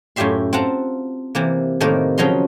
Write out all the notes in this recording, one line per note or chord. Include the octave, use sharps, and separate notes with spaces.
F#2 A2 F4 G4 E5 C6
C4 F4 F#5 A5 A#5
C3 E3 A#3
A2 C3 D#3 A#3 A#4
C#3 F3 F#3 D#5 A#5 C6